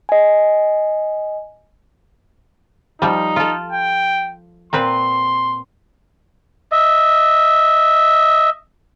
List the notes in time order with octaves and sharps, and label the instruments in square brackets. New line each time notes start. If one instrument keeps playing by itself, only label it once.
[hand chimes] D#5 G#5
[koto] F3 G3 [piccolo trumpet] D#4
[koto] F4 A4
[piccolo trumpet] G5
[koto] A#2 C4 B4 [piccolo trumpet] C6
[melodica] D#5 E5